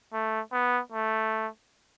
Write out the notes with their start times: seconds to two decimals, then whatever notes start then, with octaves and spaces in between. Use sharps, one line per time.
0.13 A3
0.52 B3
0.92 A3